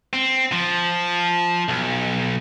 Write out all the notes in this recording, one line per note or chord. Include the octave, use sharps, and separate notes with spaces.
C4
F3
B1